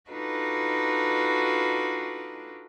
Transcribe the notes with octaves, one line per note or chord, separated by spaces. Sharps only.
D4 D#4 F4 F#4 A4 B4